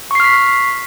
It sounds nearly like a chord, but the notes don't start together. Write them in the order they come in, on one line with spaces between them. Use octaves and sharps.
C#6 C7 F6 B6